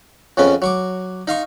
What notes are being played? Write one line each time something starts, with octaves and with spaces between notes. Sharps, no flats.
F2 C#3 B3 C#4
F#3 C#6 D6
D#4 F5 C6 C#6